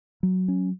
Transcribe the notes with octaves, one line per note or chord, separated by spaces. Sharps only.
F#3
C#4